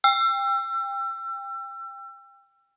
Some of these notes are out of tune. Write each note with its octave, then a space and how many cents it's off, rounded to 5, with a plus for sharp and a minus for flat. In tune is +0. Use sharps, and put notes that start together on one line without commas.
G5 +25 E6 +35